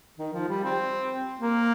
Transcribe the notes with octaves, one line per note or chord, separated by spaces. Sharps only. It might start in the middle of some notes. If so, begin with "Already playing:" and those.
D#3
F3
G3
C4
A#3